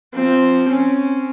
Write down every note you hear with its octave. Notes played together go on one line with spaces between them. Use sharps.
F3 C4
C4 C#4